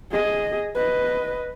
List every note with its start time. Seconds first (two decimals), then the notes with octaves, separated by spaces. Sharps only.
0.11 G#4 D#5
0.75 B4 D#5